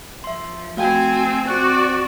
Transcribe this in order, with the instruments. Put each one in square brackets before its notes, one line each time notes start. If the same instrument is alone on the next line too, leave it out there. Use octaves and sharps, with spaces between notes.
[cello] F3 [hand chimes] E5 C6
[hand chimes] A3 F5 G5 [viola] C4 G#5 [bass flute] F#4
[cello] C4 D5 [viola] F#4 [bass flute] C5 [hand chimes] F#6